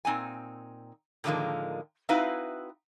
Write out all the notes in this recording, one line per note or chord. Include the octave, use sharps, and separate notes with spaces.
A#2 C4 D#4 G#5
A2 D3 D#3 F3 G#3 A#3
C4 D#4 E4 F#4 B4 F5